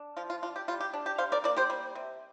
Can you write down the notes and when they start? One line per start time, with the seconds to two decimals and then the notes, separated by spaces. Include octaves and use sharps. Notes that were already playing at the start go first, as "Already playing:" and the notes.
Already playing: D4
0.17 F3 F4
0.30 F4
0.43 D4 F4
0.56 G4
0.68 G3 F4
0.80 G4
0.94 D4
1.06 G4
1.18 G3 C5 F5
1.32 A#4 D5
1.44 A#3 A#4 D5
1.56 G4 C5
1.70 G3
1.95 C3